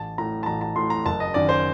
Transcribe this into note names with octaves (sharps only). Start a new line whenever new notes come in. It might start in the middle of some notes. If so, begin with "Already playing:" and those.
Already playing: A1 A5
A2 A#5
A5
A1 A#5
A5
A2 C6
A#5
F#1 A5
D#5
F#2 D#3 D5
C5